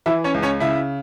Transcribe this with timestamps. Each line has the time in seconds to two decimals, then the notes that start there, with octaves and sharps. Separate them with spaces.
0.06 E3 E4 E5
0.24 C#4 C#5
0.34 C#2
0.42 C#4 C#5
0.60 C#3 E4 E5